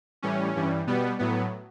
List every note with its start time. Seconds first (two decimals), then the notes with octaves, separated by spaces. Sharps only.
0.22 A2 E3 G3 C#4
0.56 G2 E3 G3
0.87 B2 G3 B3
1.19 A2 F#3 B3